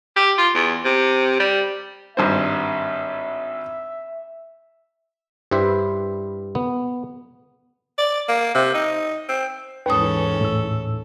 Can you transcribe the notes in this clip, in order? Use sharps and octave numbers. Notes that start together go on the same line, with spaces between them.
G4
F4
E2
C3
G3
G#1 G2 C5 E5
G2 G3 E4 B4 C5 E5
B3
D5
A#3
C3
D#4
C4
D#2 G#2 E3 C#4 A4 B4 D#6
A2 E6